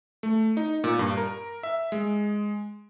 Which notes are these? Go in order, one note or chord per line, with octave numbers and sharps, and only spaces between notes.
A3
D#4
A#2
G2
A#4
E5
G#3